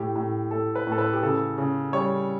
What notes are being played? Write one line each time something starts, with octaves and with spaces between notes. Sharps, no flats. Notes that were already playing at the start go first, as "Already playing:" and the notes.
Already playing: A2 G4
A2
A2 A4
B4
A2
A4
B4
G4
C#3 A4
C#3
G3 C#5